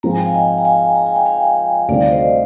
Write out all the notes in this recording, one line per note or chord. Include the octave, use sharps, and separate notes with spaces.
G#2 F3 C4 F4 A#5
G#5
G5
F5 G#5
D#5 G5
A#5
F5 G#5
A#5
G#5
G5
F5 G#5
D2 C3 D#3 G3 C4 D5 F5
C5 D#5